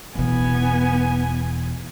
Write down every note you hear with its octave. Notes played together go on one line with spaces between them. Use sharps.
E1 E3 B3 G#5